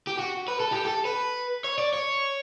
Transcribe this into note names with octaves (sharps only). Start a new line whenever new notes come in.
G4
F#4
B4
A4
G4
A4
B4
C#5
D5
C#5